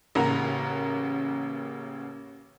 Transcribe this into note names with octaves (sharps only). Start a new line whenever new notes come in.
A1 C#3 A#3 F#5 A#5